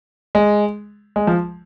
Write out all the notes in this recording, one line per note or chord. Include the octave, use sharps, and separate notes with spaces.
G#3
G#3
F3